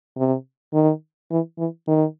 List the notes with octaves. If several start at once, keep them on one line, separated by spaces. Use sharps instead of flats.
C3
D#3
E3
E3
D#3